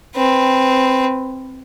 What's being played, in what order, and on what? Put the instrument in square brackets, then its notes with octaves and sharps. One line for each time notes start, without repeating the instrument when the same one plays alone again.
[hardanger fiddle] C4 B4